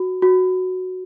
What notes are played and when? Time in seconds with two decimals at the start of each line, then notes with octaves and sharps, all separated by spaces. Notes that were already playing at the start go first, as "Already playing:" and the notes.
Already playing: F#4
0.22 F#4